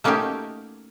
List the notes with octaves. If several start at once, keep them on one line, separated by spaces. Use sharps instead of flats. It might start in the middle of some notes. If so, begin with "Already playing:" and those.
A3 A#3 C#4 D#4 F#4 G4